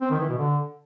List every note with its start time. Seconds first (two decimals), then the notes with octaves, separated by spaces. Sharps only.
0.01 C4
0.10 D#3
0.20 E3
0.29 B2
0.38 D3